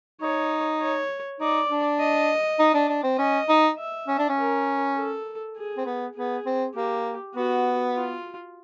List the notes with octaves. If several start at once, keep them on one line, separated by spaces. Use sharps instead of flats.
D#4 C#5
C#5
D#4 D5
D4
D#5
D#4
D4
D4
C4
C#4 D#5
D#4
E5
C#4
D4
C#4
A#4
A4
G#4
C4
B3
B3 G#4
C4
A#3 G4
B3 F#4
F4